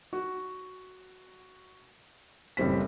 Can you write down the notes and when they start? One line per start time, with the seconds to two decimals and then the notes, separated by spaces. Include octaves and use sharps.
0.13 F#4
2.57 F#1 A2 G3 C4 B6